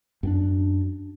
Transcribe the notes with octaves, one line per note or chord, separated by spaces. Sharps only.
F#2 C4 D4